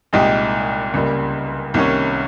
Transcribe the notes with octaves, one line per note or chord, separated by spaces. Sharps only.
C2 A#2 G#3 D#4 G4
C#2 C#3 G3 A#3
C2 C3 D#3 A#3 C#4